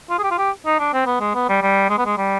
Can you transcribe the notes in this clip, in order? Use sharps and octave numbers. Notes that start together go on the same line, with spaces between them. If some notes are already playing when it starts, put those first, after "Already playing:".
F4
G#4
G4
F4
G4
D#4
D4
C4
B3
G#3
B3
G3
G3
G#3
B3
G#3
G3